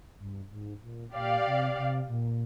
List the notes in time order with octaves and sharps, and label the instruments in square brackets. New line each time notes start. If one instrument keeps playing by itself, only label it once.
[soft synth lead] G2
G#2
A#2
[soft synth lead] A#2 [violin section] G4 D5 F5
[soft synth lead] C3
C3
A#2